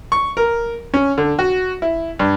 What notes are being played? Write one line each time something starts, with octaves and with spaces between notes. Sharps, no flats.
C#6
A#4
C#4
D3
F#4
E4
G2